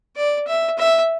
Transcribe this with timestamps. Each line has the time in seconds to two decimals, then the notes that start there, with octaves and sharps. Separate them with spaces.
0.16 D5
0.47 E5
0.78 E5